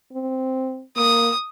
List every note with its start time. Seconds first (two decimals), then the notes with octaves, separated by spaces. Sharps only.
0.13 C4
0.97 A#3 D#6